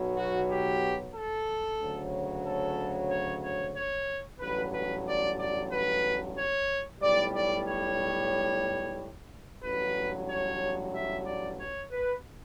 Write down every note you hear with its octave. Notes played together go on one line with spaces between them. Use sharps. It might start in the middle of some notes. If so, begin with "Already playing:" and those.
Already playing: B1 B2 F#3
F#4
G4
A4
D2 C#3 F#3
A4
C#5
C#5
C#5
A1 G2 F#3 B4
B4
D5
D5
B4
C#5
B1 A2 G3 D5
D5
C#5
A1 G2 F#3 B4
C#5
E5
D5
C#5
B4